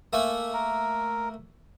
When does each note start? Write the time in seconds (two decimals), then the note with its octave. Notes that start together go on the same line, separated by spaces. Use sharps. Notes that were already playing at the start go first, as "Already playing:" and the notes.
0.13 A3 A#3 G#5
0.53 A#4